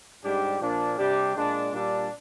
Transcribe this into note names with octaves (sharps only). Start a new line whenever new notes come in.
G#2 G3 D4 G4
A#2 F3 A#3 D4
C3 G3 D4 G4
A#2 G#3 D4
A#2 G3 D4